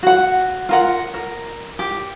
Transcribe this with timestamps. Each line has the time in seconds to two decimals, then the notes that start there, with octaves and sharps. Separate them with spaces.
0.03 F#4 F#5
0.69 F4 A#4 F#5
1.14 A#4
1.79 G4